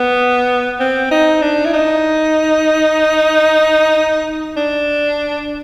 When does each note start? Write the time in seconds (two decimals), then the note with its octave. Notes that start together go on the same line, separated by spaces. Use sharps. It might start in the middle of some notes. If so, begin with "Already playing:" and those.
Already playing: B3
0.80 C4
1.11 D#4
1.42 D4
1.65 E4
1.73 D#4
4.57 D4